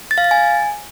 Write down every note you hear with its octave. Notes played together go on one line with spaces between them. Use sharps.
A6
F5
A6
G#5